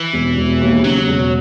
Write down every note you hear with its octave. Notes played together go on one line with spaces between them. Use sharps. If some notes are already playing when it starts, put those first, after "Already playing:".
Already playing: E3
E1
E1
D#2
C#3 F#3
E1